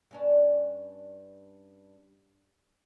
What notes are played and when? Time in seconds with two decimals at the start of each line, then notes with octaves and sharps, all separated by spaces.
0.11 G2 C#4 D4